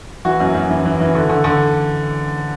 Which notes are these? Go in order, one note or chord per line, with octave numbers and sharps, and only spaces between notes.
E3 F#4
F#2
F#2
E3
E3
E3
D3
D3
D3